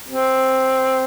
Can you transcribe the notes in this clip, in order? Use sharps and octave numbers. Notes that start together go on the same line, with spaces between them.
C4